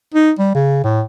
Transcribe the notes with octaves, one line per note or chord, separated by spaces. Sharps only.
D#4
G3
C#3
A2